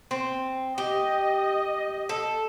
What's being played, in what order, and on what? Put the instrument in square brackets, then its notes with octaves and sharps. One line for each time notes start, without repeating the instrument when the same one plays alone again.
[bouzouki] C4
[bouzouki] G4 [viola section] D#5
[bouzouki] A4